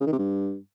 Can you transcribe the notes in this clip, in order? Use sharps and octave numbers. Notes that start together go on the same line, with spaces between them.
C#3
D#3
C3
G2